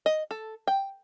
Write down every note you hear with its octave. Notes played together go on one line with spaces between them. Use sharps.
D#5
A4
G5